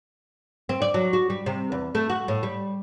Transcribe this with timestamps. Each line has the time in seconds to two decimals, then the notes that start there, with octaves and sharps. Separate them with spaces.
0.69 C4
0.82 D5
0.94 F#3
1.13 F#4
1.30 G3
1.46 C3
1.72 E2
1.95 A3
2.10 F#4
2.28 A2
2.43 G3